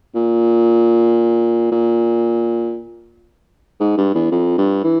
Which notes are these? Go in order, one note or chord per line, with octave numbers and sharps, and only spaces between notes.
A#2
A#2
G#2
G2
E2
F2
G2
E3